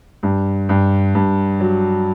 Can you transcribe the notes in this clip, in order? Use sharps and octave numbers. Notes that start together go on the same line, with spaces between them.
G2
G2
G2
F#3